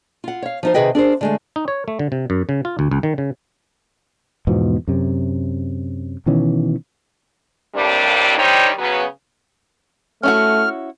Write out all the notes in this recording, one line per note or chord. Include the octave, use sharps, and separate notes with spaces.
F4 F#5
C#5 F5
F3 D#4 C5
C3 D#3 G#4 B4 D#5 G5
D4 G#4 A#4 C5
D3 G#3 A3
D#4
C#5
A3
D3
C3
F#2
C#3
F4
D2
C#2
D#3
C#3
E2 G#2 B2 F3
F#2 C3
B2 D#3 E3 C#4
F2 A2 C3 G3 A#3 D4
D#3 G3 D4 D#4 C5 C#5
C#3 F#3 B3
A3 C#4 E4 F#4 F6